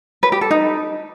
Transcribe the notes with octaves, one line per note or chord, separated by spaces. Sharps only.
B4
G4
A4
D#4